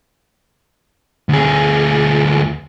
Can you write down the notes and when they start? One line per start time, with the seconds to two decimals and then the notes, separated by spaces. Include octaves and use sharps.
1.29 D2 G#4